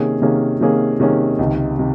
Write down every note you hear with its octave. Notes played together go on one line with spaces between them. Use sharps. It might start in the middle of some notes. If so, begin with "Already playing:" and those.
Already playing: C3 D#3 A#3 C#4 G#4
C3 D#3 A#3 C#4 G#4
C3 D#3 A#3 C#4 G#4
C3 D#3 A#3 C#4 G#4
C#2 C3 D#3
C3 D#3